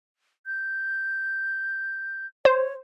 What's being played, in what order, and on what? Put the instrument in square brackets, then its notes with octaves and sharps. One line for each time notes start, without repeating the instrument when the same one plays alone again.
[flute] G6
[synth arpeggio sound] C5 [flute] C#5